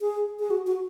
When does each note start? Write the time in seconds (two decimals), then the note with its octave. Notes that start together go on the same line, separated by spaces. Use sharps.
0.01 G#4
0.39 G#4
0.50 F#4
0.66 F#4